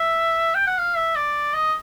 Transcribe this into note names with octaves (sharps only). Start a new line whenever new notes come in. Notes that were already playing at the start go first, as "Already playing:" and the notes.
Already playing: E5
G5
F#5
F5
E5
D5
D#5